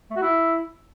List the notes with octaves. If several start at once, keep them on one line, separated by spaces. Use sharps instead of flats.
A3
F#4
E4